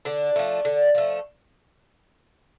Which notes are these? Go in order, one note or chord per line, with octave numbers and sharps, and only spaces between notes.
D3 D4
F3 A3
D3
F3 A3